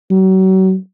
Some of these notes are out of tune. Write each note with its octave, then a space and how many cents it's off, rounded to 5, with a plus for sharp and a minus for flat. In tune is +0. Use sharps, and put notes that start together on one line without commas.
F#3 +35